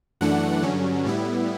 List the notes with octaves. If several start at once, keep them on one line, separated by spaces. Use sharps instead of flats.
F#2 E3 A3 D4 F#5
G2 D3 F#3 C#4
A2 G3 B3 E4